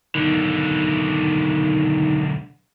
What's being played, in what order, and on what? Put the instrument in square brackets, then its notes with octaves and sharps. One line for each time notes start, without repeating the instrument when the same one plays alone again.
[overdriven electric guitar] B1 D3 [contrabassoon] D#3